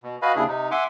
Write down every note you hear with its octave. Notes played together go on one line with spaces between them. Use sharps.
B2
F#4 B4 D#5 F5 G#5 B5
D#2 C#3 D4 E4 G#4
C3 D#4
E5 F#5 G#5 C6 D6